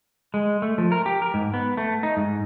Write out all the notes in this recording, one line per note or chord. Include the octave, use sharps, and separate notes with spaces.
G#3
A3
F3
A#4
G4
A#4
G#2
B3
A3
D#4
G#2